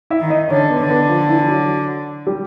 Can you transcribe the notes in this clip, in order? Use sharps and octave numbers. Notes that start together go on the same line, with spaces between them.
E4 E5
D#3
D#4 D#5
D3 C#4 C#5
B3 B4
D3
B3 B4
F3 F4
E3 E4
F#3 F#4
G3 G4